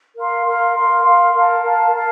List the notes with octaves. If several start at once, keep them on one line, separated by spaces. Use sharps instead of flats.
A#4 F5 C6
A#4 F5 C6
A#4 F5 C6
A#4 F5 C6
A#4 F5 A5
A#4 F5 A5
A#4 F5 A5